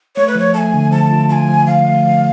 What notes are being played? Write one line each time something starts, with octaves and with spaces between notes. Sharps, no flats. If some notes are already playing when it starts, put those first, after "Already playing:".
A3 C#5
B4
F3 C#5
A3 G#5 A5
D3
F3 A5
F4
F4 G#5 A5
F3
F3 F5
A3
F3